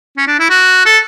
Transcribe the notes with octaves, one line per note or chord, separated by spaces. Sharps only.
C#4
D4
E4
F#4
A4